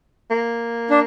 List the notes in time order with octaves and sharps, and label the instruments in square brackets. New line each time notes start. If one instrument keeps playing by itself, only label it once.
[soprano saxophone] A#3
[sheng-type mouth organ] D4